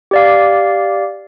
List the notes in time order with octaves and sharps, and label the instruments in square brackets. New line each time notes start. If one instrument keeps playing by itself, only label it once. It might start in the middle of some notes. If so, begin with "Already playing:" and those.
[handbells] G4 D5 F5